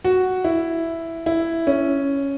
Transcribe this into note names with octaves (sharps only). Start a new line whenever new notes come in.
F#4
E4
E4
C#4